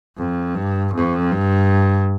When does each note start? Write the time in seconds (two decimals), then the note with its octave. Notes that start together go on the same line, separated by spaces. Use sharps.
0.17 F2
0.55 G2
0.94 F2
1.32 G2